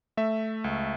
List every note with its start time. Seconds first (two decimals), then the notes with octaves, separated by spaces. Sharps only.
0.17 A3 E5
0.64 C#2